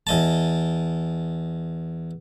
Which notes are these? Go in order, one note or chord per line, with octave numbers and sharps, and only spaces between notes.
E2 D#5 A5